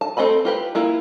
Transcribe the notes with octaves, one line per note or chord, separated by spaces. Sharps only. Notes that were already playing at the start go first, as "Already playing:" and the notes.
A5
A3 C4 D#5 G#5 B5
F4 G4 B4
A#3 E4 F4